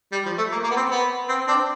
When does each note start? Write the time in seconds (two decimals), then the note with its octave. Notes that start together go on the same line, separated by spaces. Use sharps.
0.12 G3
0.26 F3
0.38 A3
0.52 A#3
0.63 A#3
0.70 B3
0.76 C4
0.90 B3
1.28 C4
1.47 C4 D4